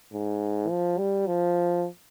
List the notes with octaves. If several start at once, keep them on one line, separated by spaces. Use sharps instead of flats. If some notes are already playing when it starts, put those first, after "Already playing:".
G#2
F3
G3
F3